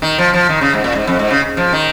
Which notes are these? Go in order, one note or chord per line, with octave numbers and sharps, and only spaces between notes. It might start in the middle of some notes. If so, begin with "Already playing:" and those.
D#3
F3
F3
D#3
C#3
G#2
A#2
G#2
F2
G#2
C#3
F3
D#3